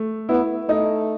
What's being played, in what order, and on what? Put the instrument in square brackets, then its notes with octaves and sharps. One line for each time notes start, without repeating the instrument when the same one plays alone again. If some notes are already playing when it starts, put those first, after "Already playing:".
Already playing: [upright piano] A3
[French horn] B3 [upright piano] E4
[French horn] A3 [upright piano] D#4